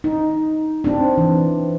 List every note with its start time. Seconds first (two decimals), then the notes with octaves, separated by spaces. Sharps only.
0.04 D#4
0.84 C4 D4
1.18 E3